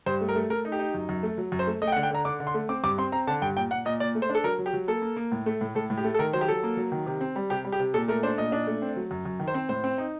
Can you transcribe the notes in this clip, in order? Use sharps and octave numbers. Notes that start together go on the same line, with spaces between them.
G2 C5
A3
A#4
A3
A3 A#4
D#4
G4
D#4
F#2
F#2
A3
F#3
F#2
C5
A3
A3 D#5
G5
F#5
D3
G5
D3 A#5
D3 D6
D3
C6
A3
C4 D6
G2 D6
C4 C6
C4 A#5
D3 A5
G2 G5
A#2 G5
A#2 F#5
A#2 D#5
A#2 D5
A3
C5
D4
A4
F#3 A#4
F#3
G4
F#3
A#3 A4
A#3
A#3
A2
A3
A2
A2 A4
A2
G4
A3
A4
D#3 A#4
F#3 C5
G4
F#3 A4
A#3
F#3
D#3
C3
C4
G3
C3 G4
G3
G4
C3
A#2 A4
A3 A#4
D4 C5
A#2 D#5
D4
A3
C4
F#3
F#2
F#2
D#3
C5
C4
A2 C5
C4
D#4